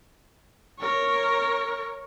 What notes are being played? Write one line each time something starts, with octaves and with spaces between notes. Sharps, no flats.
A#4 C#5